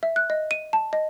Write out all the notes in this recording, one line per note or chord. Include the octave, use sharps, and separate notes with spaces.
E5
F#6
D#5
D#7
A5
D#5